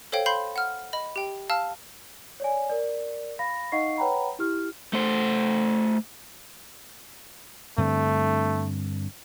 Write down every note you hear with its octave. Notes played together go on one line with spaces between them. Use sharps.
A4 C5 C#5 F5 G5
F5 B5 C6 G6 C7
F#5 F6
D#5 B5
G4 G5
F5 A5 E6 F6
C#5 D5 G#5
A#4 D5
F5 B5 A#6
D#4 D#5 F5 F#5 C#6 C7
B4 C#5 F#5 G5 A#5 B5
E4 G4 F6
A3 C5
G2 D3 A3 C4